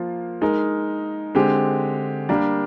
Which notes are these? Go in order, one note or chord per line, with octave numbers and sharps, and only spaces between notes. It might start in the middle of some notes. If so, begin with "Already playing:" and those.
Already playing: F3 A#3 F4
G#3 D#4 A#4
D3 G#3 C4 G4
G3 A#3 D4 G4 A#4